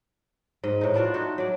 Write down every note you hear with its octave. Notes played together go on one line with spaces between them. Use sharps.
G#2 D#5
A2 D#4
B3 D4 F4 F#4
A3 D#4 F#4
F#3 D5